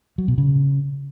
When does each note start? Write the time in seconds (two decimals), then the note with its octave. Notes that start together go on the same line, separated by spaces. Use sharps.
0.18 F#3
0.28 B2
0.38 C#3